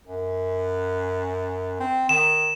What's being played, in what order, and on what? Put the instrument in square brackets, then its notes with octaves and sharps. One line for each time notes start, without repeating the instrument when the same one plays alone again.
[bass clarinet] F#2
C4
[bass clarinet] D#3 [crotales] E7